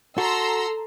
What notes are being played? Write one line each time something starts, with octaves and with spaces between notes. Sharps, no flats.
F#4 A4 A#5 C6 E6